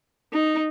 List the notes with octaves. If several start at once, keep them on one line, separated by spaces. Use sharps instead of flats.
D#4